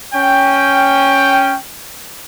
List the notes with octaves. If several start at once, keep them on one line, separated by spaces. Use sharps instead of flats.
C#4 G5